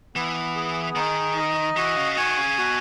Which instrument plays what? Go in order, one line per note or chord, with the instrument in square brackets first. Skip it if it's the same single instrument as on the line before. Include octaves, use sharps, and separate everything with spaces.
[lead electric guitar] E3 [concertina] B3
[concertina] G#4
[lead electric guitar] D#3 [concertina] D#4
[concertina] D#5
[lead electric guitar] E3 [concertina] F#4
[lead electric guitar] C#3
[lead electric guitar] D#3 [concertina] G#5
[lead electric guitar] C#3
[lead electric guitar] B2 [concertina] F#4